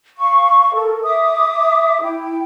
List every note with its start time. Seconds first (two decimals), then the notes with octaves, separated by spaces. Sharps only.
0.18 F5 C#6
0.75 A4 A#4
1.04 E5 D6 D#6
2.02 E4 G5